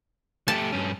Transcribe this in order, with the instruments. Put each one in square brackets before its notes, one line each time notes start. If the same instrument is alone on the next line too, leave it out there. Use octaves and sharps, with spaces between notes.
[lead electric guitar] A3 G4 [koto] A5
[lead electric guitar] G2 C#4